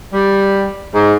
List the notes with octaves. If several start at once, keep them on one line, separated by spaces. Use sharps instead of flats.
G3
G#2